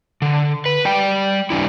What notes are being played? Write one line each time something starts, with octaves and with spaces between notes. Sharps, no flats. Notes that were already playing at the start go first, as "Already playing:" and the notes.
D3
B4
G3 D5 G5
G3 D4 E4